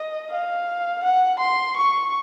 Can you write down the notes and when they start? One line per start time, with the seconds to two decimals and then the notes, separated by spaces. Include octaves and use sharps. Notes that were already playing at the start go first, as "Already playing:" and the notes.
Already playing: D#5
0.31 F5
1.03 F#5
1.39 C6
1.77 C#6